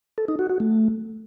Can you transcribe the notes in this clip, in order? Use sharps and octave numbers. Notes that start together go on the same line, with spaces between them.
A4
D#4
F#4
F#4
A3